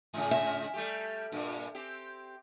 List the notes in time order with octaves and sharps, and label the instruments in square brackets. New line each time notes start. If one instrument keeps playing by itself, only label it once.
[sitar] G#2 C#3
[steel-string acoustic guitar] E5
[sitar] G3 A3 G4
G2 A#2
C4 G4